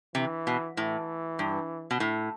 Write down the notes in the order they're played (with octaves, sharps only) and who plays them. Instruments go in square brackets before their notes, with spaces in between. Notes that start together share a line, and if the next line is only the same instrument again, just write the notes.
[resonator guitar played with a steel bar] C3 [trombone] E3
[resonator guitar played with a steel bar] B2
[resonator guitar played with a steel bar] A2 [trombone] E3
[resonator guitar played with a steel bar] G2
B2
A2